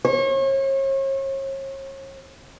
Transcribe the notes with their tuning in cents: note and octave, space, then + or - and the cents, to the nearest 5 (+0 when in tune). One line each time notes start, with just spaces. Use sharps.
C#5 -40